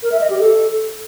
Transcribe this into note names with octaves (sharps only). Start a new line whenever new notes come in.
A#4
E5
D#5
G4
A4